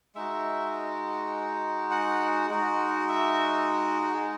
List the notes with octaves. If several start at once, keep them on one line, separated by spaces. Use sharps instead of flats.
G#3 D#4 F#4 E5
F#5
G#3 D#4 F#4
E5
F#4
G#4